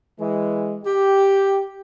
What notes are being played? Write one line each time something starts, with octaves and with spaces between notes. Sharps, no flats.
E3 G#3
G4